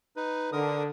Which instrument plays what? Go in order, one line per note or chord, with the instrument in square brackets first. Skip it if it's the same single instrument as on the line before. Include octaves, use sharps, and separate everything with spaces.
[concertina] D#4 B4
[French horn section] D3 [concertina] A#4 D#6